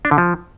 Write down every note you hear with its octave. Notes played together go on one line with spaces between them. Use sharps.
D4
D3
F3